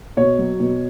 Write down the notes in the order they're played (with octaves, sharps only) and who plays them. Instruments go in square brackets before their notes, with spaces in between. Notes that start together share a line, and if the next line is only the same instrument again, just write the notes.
[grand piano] B2 C#5
F#3
B2